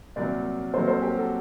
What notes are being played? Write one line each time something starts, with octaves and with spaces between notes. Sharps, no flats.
C2 A#2 F#3 A#3 A#4 D5
C2 A#2 F#3 A#3 A4 C5
A4 C5
G4 A#4
F#4 A4